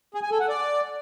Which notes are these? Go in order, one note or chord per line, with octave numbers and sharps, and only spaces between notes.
G#4
G#5
A4
F#5
D5